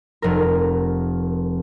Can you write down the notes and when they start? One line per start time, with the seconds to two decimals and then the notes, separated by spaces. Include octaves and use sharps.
0.22 F1 A#4